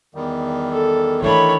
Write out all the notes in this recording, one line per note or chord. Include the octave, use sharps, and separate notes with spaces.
E2 D#3 G3
A4
D#3 E3 A3 D4 C#5 B5